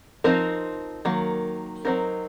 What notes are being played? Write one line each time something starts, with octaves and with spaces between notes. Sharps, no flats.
F3 C4 D#4 A#4
D#3 F#3 A#3
F#3 C4 D#4 A#4